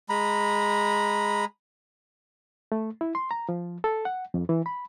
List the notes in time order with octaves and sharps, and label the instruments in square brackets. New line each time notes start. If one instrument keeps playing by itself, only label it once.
[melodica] G#3 A#5 B5
[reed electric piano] A3
E4
C6
A#5
F3
A4
F#5
F2
E3
B5